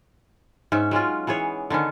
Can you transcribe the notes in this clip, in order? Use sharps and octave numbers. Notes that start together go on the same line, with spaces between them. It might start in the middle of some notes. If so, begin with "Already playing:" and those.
G#2 C#4 E5
F#3 G#3 C#4 F4
E3 B3 G#4 C#5
D3 D#3 B3 C#4